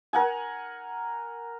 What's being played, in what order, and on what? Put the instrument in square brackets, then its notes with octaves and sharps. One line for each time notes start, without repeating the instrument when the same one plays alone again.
[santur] A#4 F#5 G#5